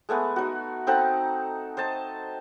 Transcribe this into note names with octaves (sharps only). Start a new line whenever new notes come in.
G#3 A3 B3 B4
D#4 F#4
C4 D#4 A4 F#5
C5 D#5 A5